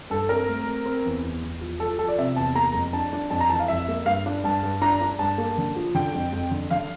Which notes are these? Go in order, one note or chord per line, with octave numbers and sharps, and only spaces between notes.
G2 A4
C4 A#4
A3
C4
C4
E2
E2
E2
F3
F3 A4
F3 A4
D5
C3 E5
E2 A5
A#3 A#5
F2
D4 A5
D4
F2 A5
A#5
E3 A5
F5
F2 E5
A#3
G2 F5
D4
G2 A5
G2
D4 A#5
D4
G2 A5
A#3
D3
F3
D3 G5
F2
F2
D3
D3 F5